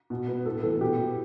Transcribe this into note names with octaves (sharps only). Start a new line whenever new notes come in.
B2
B3
A2 A4
E3 B3 A4
B2 G4
B3